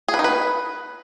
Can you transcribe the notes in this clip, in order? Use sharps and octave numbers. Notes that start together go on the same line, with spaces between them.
G#4
B4
D#4
B4